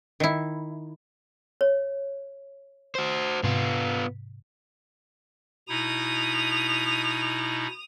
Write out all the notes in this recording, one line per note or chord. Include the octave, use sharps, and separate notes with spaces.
D#3 E4
C#5
F#4 C5
G#2 C3 B3 F4
B2 D#4 E4 D#6 F7